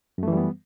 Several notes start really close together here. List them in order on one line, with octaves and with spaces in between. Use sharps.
F#2 A3 E3 G3 B3